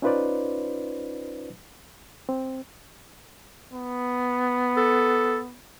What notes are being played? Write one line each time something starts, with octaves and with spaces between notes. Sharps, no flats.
C#4 D#4 F4 B4 C5 D5
C4
B3
A4